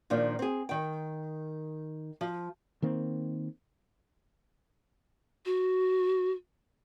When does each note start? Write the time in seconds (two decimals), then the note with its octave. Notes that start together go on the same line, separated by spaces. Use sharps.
0.10 A#2 D#3 F3 D4
0.39 C4 G#4
0.69 D#3 G5
2.21 F3
2.82 D#3 A#3 C4
5.45 F#4